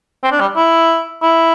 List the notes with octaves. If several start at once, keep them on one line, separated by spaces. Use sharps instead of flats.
C4
D4
G3
E4
E4